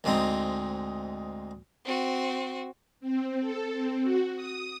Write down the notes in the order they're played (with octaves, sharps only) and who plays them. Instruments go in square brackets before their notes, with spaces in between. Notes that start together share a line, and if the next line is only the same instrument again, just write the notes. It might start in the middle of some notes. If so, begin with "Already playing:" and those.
[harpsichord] D2 G#2 C4 D#4
[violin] C4 F#4
[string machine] C4
A4
C4
F#4
D#6